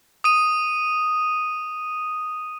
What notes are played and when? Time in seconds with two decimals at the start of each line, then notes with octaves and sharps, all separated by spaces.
0.24 D#6 D#7